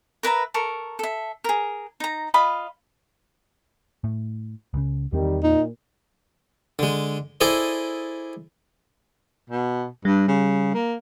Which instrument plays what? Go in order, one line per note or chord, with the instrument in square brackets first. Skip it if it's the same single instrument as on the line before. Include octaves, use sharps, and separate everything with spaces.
[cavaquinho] A#4 B4 E5 A#5
A4 A#4 C#6
A4 E5
G#4 A#4
D#4 A#5
F4 D#5 F5 B5
[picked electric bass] A2
C#2 C#3
[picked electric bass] E2 C4 [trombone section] D#3 G3
[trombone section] A#2 [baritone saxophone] D#4
[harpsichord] D3 G#3
E4 G#4 A4 C5 D5 D#5
[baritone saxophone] B2
[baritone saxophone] G2 [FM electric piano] G3
[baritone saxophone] C#3
A#3